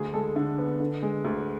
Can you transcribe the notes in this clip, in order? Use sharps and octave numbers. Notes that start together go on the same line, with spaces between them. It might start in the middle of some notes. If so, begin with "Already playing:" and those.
Already playing: D2 G#4
G#3 A4
D3
B3
D3
G#3
D2